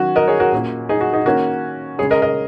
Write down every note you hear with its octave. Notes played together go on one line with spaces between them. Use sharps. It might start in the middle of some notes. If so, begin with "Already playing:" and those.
Already playing: D#3 F#3 C#4 F#4
A#4 D#5
G#4 C#5
F#4 A#4
A#2 A#3 C#4
D#4 G#4
F#4
D#4 G#4
D#3 A#3 C#4 F#4 A#4
C#3 G#3 C#4 G#4 C#5
A#4 D#5
A#4 D#5